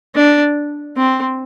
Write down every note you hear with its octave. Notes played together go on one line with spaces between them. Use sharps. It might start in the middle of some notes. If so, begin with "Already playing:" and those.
D4
C4